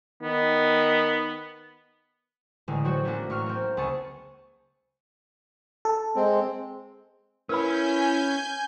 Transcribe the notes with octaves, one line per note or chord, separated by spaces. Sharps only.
D#3 B3
A1 D3 G#3
F#3 C4 F#4 C#5
A3 A#3 C#4 D4 F#4
A1 C#6 F6
A#3 C4
C#2 G#4 A5 C#6 A6 C#7
A4
G#3 C4
C#4 E4 A#4 B4 G#5 B5 G6